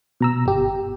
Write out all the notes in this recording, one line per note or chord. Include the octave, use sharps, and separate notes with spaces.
B2 A#5 E6
G1 G4